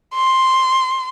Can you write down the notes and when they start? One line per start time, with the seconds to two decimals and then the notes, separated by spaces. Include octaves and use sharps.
0.15 C6